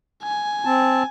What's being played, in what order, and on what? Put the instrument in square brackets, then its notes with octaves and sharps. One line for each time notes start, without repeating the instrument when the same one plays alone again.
[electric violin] G#5
[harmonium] C4 A5